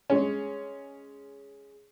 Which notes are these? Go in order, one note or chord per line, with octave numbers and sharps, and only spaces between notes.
G#3 C#4